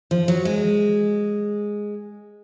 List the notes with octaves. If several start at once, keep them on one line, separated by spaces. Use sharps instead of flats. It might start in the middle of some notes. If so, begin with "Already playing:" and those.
F3
F#3
G#3